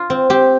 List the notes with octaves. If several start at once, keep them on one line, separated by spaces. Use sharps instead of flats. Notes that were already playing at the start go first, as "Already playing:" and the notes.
Already playing: F4
C4
C4 G4